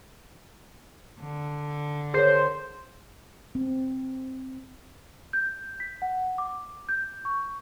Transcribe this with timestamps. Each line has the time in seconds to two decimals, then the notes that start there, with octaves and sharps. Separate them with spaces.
1.20 D3
2.14 G#4 A#4 C5 C#5
3.55 C4
5.33 G6
5.80 B6
6.02 F#5
6.38 D6
6.89 G6
7.25 C#6